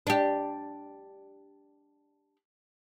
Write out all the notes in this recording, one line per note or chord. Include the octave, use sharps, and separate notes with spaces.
D4 G4